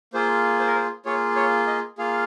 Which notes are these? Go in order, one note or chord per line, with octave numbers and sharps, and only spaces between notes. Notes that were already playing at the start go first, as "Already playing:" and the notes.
A#3 F4 G#4 C5
C5
A#4
C5
A#3 F4 G#4 C#5
C#5
D#5
A#3 F4 G#4 F5